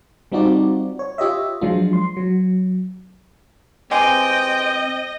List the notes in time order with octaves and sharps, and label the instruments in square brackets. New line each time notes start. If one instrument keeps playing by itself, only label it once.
[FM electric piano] G3 C4 D#4 F4 F#4 D5
C#5
F4 G4 C#5 D#5 E5
F3 F#3 G#3 D4 F4
C6
F#3
[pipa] E3 G#3 G4 [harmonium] C4 [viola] D#5 [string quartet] G5